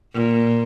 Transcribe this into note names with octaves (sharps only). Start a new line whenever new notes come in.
A#2